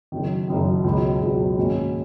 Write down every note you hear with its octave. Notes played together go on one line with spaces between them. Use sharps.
F#1 F#2 D#3
F#1 F#2 D#3
C#2 B2 F#3
C#2 B2 F#3
G#2 D#3 A#3 C#4 F#4